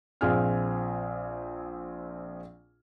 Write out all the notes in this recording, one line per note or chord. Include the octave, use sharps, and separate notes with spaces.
A#1 C4 F4 G#4 G#5 F6